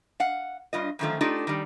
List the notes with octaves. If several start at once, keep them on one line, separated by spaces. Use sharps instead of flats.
F5 F#5
G2 F4 D#5
F#2 D3 D#3 F3 A3 F4
A3 D4 D#4 F4 G4 A4
D#3 G3